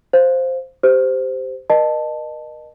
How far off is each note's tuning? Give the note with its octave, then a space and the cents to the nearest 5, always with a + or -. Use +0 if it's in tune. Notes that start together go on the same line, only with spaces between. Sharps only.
C5 +0 F5 -5
G4 +0 C5 -15
A#4 +35 D#5 -25 A5 +0